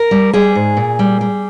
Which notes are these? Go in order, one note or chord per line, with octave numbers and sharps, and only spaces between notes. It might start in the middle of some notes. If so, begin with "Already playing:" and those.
Already playing: A#4
G3
G3 G#4
G#2
A#2
G3
G3